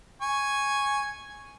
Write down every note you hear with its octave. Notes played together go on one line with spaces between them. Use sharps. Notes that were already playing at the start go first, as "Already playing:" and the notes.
G#5 C#6